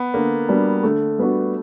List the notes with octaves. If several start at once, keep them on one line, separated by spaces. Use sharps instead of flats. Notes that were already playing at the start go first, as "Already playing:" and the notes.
Already playing: B3
D3 A#3
G3 B3 D4 F#4
D3 A3
G3 B3 D4 F#4